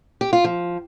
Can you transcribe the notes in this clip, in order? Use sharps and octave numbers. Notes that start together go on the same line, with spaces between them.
G4
F4
F3